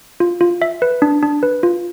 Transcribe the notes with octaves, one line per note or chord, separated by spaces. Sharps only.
F4
F4
E5
B4
D4
D4
B4
F4